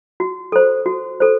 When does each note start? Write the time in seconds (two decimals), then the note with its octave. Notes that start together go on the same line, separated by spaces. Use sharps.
0.20 F#4
0.52 A4 C5
0.86 F#4
1.20 A4 C5